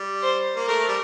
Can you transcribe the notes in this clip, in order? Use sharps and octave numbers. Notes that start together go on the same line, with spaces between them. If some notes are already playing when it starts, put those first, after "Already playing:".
Already playing: G3
C5
A#3
A3 A#4
G3